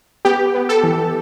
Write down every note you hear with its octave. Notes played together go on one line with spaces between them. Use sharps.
B3 G4
B3
A4
E3